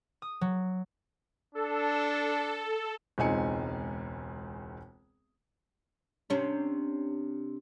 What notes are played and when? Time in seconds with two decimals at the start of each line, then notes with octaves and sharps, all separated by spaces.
0.22 D#6
0.41 F#3
1.55 D4 A4
3.18 E1 C#2 C4 D#4 G#5 C#7
6.30 C3 C#4 D4